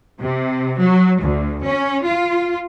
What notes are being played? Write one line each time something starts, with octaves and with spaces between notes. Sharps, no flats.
C3
F#3
D2
C#4
F4